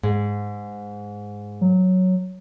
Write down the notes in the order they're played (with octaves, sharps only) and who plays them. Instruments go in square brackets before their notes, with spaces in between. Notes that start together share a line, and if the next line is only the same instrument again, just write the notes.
[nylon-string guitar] G#2
[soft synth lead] F#3